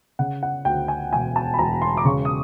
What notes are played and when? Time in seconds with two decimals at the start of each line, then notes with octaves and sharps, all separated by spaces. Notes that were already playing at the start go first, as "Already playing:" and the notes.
0.19 C#3 F#5
0.43 F#5
0.65 D2 G5
0.88 G#5
1.12 E1 G#5
1.36 A5
1.54 B5
1.59 E1 A#5
1.82 C6
1.97 D6
2.05 C#3 C#6
2.25 D#6